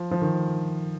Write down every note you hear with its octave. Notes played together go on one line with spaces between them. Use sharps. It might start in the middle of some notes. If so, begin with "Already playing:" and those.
Already playing: F3
F3
D#3